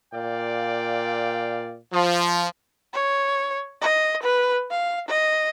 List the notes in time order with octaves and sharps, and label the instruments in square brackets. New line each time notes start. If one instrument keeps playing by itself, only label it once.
[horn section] A#2 D5 F5 G5
F3
[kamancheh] C#5
D#5
B4
F5
D#5